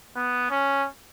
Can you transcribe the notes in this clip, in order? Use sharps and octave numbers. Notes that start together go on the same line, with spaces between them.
B3
C#4